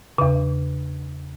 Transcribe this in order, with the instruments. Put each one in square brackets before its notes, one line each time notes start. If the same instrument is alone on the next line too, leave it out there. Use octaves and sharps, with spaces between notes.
[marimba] E2 C#3